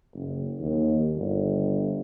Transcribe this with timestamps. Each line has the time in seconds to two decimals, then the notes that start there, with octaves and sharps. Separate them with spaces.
0.14 F#1
0.60 D#2
1.16 G1